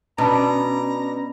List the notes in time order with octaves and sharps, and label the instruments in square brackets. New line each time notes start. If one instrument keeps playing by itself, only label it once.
[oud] B2 [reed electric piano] C#4 B5 [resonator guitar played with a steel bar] D4 [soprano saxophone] A#5